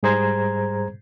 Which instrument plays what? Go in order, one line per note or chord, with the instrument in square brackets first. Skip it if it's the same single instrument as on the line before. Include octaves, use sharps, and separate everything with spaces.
[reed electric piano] G#2 G3 G#4 C5 A#5 G#6